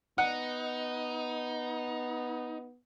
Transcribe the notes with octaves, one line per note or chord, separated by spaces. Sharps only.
B3 D#4 F#5